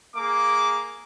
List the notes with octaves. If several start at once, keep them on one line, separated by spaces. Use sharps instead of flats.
A#3 G#4 D6